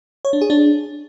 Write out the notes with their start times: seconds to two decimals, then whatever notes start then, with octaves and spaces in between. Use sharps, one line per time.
0.25 C#5
0.33 D4
0.41 G#4
0.50 D4